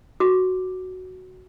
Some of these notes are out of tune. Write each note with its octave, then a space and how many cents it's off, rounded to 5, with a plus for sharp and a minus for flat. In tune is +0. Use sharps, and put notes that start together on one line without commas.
F#4 +0 D6 +0